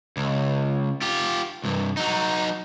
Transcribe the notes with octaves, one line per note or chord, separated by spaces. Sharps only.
C#2
F4 G4
C2 G2
F#3 D#4